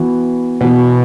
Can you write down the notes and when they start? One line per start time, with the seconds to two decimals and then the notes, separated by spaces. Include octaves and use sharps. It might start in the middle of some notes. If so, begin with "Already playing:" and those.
Already playing: E3 B3 F#4
0.61 B2 E3 B3 F#4